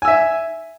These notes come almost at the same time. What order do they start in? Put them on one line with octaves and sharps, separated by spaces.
G#5 E6 E5